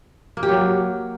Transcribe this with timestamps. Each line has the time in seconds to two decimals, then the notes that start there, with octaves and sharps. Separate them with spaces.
0.37 A#3
0.43 G4
0.49 F#3